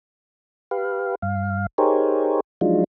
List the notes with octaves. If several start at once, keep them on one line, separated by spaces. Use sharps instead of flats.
G4 B4 F5
G2 F5
D#4 G4 G#4 A#4 C5 C#5
F3 F#3 G#3 D4 D#4 F4